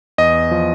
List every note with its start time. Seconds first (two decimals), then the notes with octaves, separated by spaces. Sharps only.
0.18 E2 D#5
0.51 F3